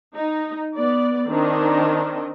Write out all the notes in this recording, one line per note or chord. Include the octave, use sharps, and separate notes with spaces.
D#4
B3 D5
D#3 C4 D4 D#5